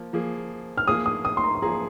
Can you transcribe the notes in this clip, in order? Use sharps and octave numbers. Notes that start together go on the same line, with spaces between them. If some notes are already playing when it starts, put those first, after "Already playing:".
Already playing: F3 A#3
F3 A#3 G#4
F6
F3 A#3 G#4 D#6
D#6
D#6
C6
A#5
C6
F3 A#3 G#4 A#5